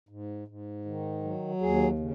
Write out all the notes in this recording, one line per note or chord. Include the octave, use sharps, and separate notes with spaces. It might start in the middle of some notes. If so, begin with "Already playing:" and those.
G#2
G#2
D#3
F#3
D#2 G#4
C#3